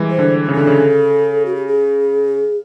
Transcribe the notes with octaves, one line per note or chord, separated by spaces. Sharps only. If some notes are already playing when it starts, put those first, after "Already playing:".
Already playing: E3 G3 G#3
C5
D3
C#3
D3 A4
C#3
F#4
G4
G#4